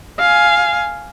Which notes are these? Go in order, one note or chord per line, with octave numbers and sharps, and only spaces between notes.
F5 G#5